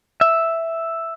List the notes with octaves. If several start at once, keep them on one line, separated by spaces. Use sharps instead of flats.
E5